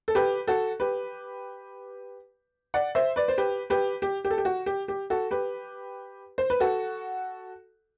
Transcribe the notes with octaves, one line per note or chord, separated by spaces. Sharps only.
A4
G4 B4
F#4 A4
G4 B4
D5 F#5
C5 E5
B4 D5
C5
G4 B4
G4 B4
G4
G4
A4
G4
F#4
G4
G4
F#4 A4
G4 B4
C5
B4
F#4 A4